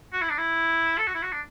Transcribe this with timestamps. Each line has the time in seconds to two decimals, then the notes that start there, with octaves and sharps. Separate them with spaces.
0.13 F#4
0.21 E4
0.30 D4
0.38 E4
0.98 A4
1.07 F#4
1.14 E4
1.22 F#4
1.32 D4